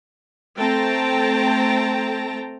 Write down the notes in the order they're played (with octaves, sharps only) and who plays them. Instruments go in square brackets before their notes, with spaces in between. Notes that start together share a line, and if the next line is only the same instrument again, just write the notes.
[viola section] A3 C4 G5 A5 A#5